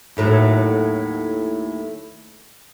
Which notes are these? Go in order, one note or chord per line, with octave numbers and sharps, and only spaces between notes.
D#2 A2 F#3